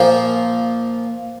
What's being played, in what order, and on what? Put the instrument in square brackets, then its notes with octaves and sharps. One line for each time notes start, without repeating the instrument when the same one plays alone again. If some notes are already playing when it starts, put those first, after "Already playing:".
Already playing: [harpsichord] A#2 F3 A#3 C5